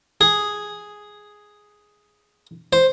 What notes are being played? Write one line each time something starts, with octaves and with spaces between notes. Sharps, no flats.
G#4
C5